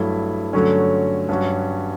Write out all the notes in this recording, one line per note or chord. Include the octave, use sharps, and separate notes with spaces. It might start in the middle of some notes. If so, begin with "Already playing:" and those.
Already playing: G2 F#3 A3 E4
G2 D3 F#3 A3 C#4
G2 F#3 C#4 F#4